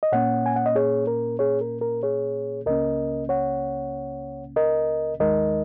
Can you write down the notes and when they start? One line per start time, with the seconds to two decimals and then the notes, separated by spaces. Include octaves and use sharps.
0.03 D#5
0.12 A#2 A#3 C#4 C#5 F#5
0.46 G#5
0.56 F#5
0.66 D#5
0.76 G#4 C#5
1.07 A#4
1.39 G#4 C#5
1.61 A#4
1.81 A#4
2.03 G#4 C#5
2.66 C#2 C#3 A#3 C#4 A#4 D#5
3.29 C#5 F#5
4.56 A#4 D#5
5.20 D#2 D#3 G#3 D#4 A#4 D#5